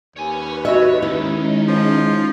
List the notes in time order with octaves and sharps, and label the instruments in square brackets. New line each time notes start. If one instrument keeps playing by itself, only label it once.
[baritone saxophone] D#2 [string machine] B4 [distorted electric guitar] C#5 G#5
[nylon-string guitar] F#4 D#5 E5 [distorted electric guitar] C#5
[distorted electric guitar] D#3 [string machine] G#3 C#4 D#4 [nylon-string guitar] E4
[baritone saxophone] F3